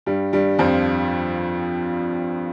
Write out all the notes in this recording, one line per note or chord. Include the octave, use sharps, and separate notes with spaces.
G2 G3
G2 G3
F2 F3